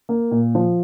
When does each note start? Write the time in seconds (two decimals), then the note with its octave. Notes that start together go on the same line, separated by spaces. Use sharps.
0.09 A#3
0.31 A#2
0.55 F3